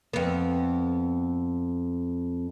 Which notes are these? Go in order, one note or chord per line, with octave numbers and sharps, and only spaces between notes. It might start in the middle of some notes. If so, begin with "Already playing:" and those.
F2 B3